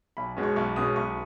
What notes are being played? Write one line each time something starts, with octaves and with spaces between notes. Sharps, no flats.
B1 B5
B2 G#3 C#4
C#6
B1 C#6
B2 G#3 C#4 D#6
B1 C#6